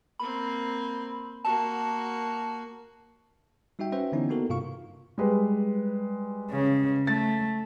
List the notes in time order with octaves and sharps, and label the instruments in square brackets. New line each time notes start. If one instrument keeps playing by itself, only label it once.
[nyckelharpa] A#3 C4 [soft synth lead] B5
[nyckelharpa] A#3 F#4 [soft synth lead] A5
[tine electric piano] G3 D#4 F#4 E5 G5
C#4 F#4 B4 C5 E5 G5
D3 E3 B3 C#4 D#4 E4
A#3 B3 D#4 F#4 A4 A#4
G2 C3 F4 F5 C#6
[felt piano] G3 G#3 B4
[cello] C#3
[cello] A3 [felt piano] A6